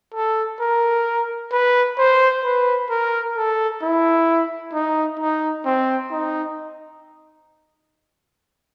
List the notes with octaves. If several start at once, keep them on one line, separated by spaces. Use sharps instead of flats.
A4
A#4
B4
C5
B4
A#4
A4
E4
D#4
D#4
C4
D#4